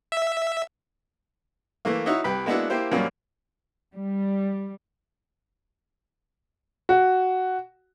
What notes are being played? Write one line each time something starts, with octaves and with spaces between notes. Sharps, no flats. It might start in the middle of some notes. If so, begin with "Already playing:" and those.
E5
E3 A3 A#3
D#4 E4 F#4 C#5 D#5 E5
C2 G4 B4 B5
G#3 A#3 B3 D4 E4 F#4
A#3 E4 G4 C5
F#2 A#2 F3 G3 A#3 C#4
G3
F#4